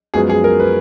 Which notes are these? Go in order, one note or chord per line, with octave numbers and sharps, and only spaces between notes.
F#2 F3 G#3 B3 G#4
G#4
A#4
B4